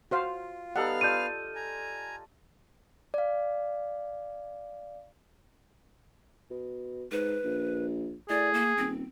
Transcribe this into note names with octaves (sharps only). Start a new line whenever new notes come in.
F4 F#4 C5 F5
G3 B3 D#4 A4 F5 F#5 F6
D4 F4 G6 D#7
G#5 A#5
D5 F5
B2
G#2 B4
A#1
A2 G#4 D5
A#3
D#1 C4